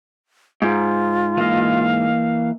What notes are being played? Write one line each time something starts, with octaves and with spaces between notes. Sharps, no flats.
G#2 F4
E3 A#3 D#5 F5